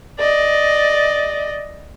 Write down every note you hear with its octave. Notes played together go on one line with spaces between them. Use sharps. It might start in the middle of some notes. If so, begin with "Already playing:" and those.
D5 D#5